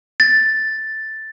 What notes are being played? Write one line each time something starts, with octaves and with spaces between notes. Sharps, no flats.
A6